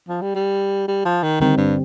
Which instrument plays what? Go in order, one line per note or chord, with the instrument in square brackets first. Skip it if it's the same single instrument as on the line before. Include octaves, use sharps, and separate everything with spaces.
[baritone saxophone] F3
G3
G3
G3
F3
D#3
[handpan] D3 G3 C4 [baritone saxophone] D#3
[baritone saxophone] G2